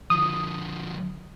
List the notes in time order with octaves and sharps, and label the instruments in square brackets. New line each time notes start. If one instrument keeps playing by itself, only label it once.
[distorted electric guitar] D3 F3 [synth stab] D#6